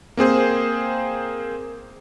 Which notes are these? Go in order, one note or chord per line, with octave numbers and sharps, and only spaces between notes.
A#3 C4 G#4 C5